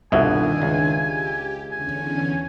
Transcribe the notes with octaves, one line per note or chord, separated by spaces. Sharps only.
G1 C2 B2 D#3 D4 E5 G#5
C#2
G4
E2 D3 C#4 G#5